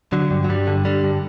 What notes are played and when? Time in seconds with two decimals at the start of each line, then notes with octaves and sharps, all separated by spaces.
0.12 D3 F#3
0.31 G2
0.44 F#3
0.49 G2 G3
0.67 D3
0.85 D3 G3
1.04 G2